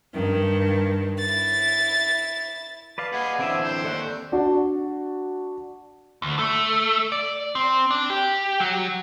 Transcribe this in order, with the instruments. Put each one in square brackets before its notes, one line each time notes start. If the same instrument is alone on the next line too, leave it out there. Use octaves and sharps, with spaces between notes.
[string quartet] G2 D#3
E4 A6
[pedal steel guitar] B4 D5 F5 [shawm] A5
[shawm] G#4 [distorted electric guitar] D#5 F#5
[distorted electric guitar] D3 E3 [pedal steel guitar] C4 D5 E5 [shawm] G#4
[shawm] C5
[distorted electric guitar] D#2 [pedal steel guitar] A4 D5 F#6
[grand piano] D4 F#4 D5 A5
[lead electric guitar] D2
A3
D5
C4
D4
G4
F#3